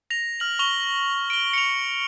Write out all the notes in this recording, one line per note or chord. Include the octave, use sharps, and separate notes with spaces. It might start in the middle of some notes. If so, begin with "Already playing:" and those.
A#6 F7
F6 F#7
C#6 F7 G7
D7 G7
C#7 F7